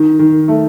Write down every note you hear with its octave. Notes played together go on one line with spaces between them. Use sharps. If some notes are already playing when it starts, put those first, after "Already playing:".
Already playing: D#3
D#3
A3